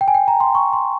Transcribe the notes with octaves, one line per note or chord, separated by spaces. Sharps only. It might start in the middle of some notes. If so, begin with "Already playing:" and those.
G5
G#5
G5
A#5
C6
C#6
C6